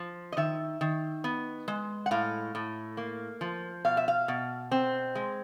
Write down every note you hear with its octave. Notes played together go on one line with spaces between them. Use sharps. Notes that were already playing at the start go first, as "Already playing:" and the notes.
Already playing: F3
D#5
D#3 E5
D#3
B3
G#3
F#5
A2 F5
A2
A#3
F3
B2 F5
E5
F5
B2
C4
G#3